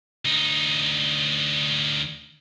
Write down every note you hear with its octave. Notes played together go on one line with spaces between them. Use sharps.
D2 D#4